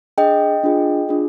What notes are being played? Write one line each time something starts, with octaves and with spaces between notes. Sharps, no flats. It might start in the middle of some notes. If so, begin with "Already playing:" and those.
D4 G#4 D#5 G5
D4 F4 G#4
D4 F4 G#4